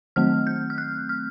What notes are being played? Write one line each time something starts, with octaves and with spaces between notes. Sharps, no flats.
D#3 F#3 A3 C4 F6
G6
F6
F#6
F6